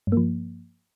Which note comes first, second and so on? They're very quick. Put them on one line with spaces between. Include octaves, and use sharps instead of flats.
G2 A#3 F3